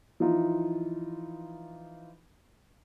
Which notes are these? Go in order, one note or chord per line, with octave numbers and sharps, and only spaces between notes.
E3 F3 D#4 F4